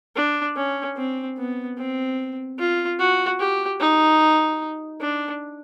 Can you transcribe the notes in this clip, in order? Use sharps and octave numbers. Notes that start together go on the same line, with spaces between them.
D4
C#4
C4
B3
C4
F4
F#4
G4
D#4
D4